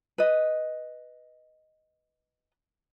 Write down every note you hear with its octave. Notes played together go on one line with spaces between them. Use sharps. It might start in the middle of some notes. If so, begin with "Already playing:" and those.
B4 D#5